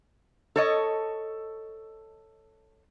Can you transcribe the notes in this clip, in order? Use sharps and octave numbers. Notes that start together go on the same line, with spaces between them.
A4 C#5 D#5